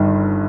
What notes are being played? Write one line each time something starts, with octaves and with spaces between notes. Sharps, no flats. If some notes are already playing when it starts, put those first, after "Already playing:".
Already playing: G1 G2 D#3